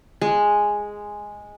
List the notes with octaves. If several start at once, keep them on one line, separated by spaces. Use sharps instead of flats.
G#3